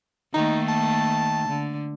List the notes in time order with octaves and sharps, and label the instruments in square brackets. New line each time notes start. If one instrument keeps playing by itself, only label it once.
[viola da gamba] D#3 A3 A#3 [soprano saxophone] D#4
[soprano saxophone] A5
[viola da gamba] D3